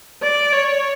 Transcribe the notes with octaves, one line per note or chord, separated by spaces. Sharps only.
D5
C#5